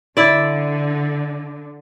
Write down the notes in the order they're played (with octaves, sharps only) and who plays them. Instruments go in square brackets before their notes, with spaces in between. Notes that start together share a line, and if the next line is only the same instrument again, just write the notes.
[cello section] D3 [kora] E4 D5